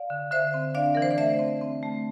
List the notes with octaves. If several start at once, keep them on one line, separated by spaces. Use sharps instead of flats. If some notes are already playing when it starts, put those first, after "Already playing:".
Already playing: D5 F5
D3
D3 C5 E5
C4
D4 D5 F5
E3 A#4
C5
D5
A3 C5 E5
C4
C4
A3